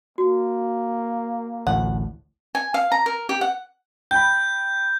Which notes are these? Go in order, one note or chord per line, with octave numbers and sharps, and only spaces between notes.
A#3 F#4
A1 D2 A2 F#5
G#5
F5
A#5
A#4
G4
F#5
G5 B5 G6